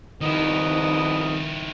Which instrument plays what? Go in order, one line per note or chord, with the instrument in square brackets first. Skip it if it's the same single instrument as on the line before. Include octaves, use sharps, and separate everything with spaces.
[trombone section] C2 F2 B3 [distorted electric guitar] D#3 E4 [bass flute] D#4 [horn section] D#5